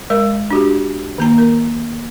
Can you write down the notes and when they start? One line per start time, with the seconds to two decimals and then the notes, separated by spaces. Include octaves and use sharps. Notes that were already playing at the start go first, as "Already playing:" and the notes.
0.10 G#3 A#4 D#5
0.51 D4 F#4 G4
1.18 D#3 A#3 A#5
1.38 A#4